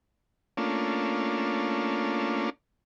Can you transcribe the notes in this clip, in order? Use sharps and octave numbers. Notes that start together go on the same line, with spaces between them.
A3 A#3 C#4 D4 F4